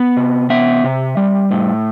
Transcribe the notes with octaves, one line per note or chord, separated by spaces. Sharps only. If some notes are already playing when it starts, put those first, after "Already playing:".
Already playing: B3
C3
B3 E5
C3
G3
A2